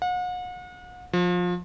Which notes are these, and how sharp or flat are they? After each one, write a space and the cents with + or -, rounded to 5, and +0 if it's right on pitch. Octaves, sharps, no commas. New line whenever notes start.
F#5 -40
F3 +25